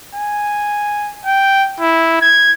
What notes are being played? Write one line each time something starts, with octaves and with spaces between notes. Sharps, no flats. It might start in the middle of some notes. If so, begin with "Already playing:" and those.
G#5
G5
E4
G#6